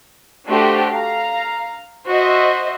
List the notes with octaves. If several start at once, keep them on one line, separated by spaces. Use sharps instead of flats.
A3 D4 F#4 G4 A4 C5
F5 A#5
F#4 C5 D#5 E5